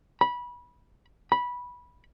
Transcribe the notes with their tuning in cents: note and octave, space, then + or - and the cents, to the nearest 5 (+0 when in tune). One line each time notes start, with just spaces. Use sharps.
B5 -20
B5 -15